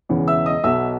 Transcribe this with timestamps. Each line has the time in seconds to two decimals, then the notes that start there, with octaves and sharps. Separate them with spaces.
0.09 E1 E2 C#3 E3
0.28 E5 E6
0.46 D#5 D#6
0.64 B1 B2 E5 E6